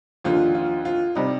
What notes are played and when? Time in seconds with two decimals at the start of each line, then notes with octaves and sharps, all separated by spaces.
0.24 D#2 D3 F3 F4
0.55 F4
0.85 F4
1.15 C3 G3 D#4